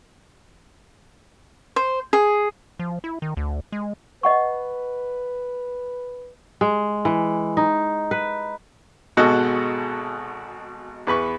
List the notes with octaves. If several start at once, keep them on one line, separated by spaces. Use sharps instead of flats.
C5
G#4
F3
E4
D#3
D2
G#3
B4 D#5 F#5 C#6
G#3
E3
D#4
B4
G#1 B2 G#3 F#4 A4 D#5
E2 B4 B5 C#6